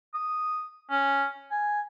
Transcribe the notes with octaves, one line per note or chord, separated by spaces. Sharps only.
D#6
C#4
G#5